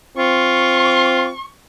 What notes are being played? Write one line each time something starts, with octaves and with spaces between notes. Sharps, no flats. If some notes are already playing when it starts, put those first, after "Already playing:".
C4 F4 C#6